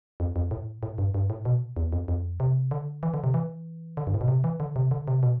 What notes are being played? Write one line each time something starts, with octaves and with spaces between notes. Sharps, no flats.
F2
F2
A2
A2
G2
G2
A2
B2
E2
F2
F2
C3
D3
E3
D3
C3
E3
D3
G2
A2
B2
C3
E3
D3
C3
D3
C3
B2